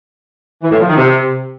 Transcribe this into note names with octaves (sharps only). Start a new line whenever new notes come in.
E3
A2
F3
D#3
C3